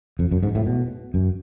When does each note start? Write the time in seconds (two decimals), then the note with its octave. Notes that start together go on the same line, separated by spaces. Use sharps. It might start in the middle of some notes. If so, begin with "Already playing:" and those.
0.19 F2
0.31 F#2
0.43 G#2
0.55 A2
0.67 B2
1.14 F#2